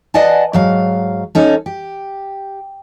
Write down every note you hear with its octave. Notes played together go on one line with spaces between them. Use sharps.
B4 D5 D#5 F#5 G#5 A5
G#2 F#3 F5
C#4 D#4 A4
G4